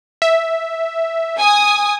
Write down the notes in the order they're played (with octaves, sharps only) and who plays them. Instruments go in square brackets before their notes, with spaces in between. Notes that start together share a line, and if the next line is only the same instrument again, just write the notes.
[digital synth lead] E5
[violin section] G#5 D#6